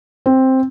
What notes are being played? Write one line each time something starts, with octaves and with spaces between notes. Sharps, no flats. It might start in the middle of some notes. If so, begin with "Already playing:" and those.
C4